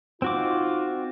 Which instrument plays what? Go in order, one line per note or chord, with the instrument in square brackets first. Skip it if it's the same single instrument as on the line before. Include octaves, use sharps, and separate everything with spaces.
[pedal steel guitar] C4 F#4 D6 [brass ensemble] D#4 F4